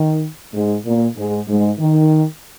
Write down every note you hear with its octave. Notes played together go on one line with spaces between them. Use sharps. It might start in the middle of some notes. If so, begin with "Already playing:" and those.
Already playing: D#3
G#2 G#3
A#2 A#3
G#2 G#3
G#2 G#3
D#3